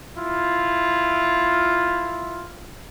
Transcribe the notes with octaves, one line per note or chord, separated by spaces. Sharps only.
E4 F4